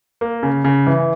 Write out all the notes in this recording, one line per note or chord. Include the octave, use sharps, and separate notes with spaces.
A#3
C#3
C#3
E3